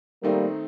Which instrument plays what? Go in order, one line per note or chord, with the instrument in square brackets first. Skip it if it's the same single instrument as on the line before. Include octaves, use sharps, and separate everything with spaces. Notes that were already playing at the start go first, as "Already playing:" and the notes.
[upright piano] D#3 A3 C4 D#4 [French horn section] G3 A#3